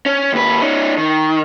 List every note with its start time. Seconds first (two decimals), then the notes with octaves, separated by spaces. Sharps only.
0.06 C#4
0.33 D#2 B4
0.62 C#4 D#4
0.98 D#3